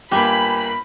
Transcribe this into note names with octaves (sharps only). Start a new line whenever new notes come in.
G1 A#3 G4 G#5 B5